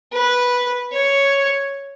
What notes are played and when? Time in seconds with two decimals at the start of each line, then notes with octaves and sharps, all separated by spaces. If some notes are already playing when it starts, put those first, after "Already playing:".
0.13 B4
0.92 C#5